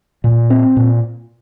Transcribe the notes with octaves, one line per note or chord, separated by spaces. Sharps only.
A#2
C4
A#2